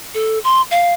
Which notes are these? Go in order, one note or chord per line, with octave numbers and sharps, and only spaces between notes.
A4
C6
F5